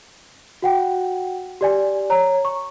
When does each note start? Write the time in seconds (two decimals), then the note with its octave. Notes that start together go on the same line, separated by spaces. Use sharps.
0.62 F#4 F#5 G5
1.61 G4 D5 G#5
2.10 C#5 A#5
2.45 C#6